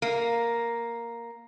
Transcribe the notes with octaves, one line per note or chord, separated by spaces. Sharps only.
A#3